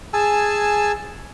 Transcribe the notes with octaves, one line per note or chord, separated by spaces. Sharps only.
G#4 G#5 A5 E6